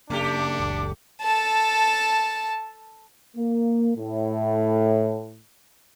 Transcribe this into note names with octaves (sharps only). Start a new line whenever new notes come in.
C#3 A3 A#3 C#4 D4 G4 D6
F#1 C#2
A4 A5
A#3
A2